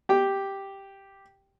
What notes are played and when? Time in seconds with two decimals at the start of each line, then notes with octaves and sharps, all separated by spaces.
0.09 G4 G5